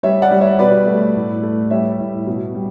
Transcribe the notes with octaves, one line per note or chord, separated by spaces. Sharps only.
G3 C#5 E5
D5 F#5
G3
C#5 E5
B2 B4 D5
A3
A2
A3
G3 C#5 E5
A2
B2
G3